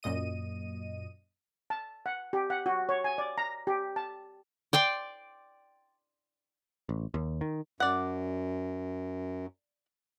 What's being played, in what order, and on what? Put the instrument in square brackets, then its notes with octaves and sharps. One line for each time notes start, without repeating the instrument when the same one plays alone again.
[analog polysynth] F#2 A#2 D#5 D#7
[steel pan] A5
F#5
G4
F#5
F#4
C#5
G#5
D5
A#5
G4
A5
[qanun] D5 G5 C6
[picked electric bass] A1
D#2
D#3
[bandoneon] F#2 [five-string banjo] D5 F#5